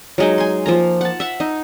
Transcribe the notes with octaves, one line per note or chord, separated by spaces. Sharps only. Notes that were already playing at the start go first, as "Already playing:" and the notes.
F#3 G#3 D#4
G#5 C6
F3 A#3 A#5
F#5 A5
E5 F#5
D#4